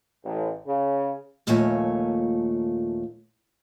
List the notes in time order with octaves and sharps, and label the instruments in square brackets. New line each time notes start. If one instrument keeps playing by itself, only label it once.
[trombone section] A1
C#3
[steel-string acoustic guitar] D#2 A#2 F3 A3 C#5 G#5